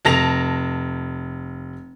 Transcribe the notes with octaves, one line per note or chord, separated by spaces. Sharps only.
F1 A5 A#6 F7